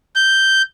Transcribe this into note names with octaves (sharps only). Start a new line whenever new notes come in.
G6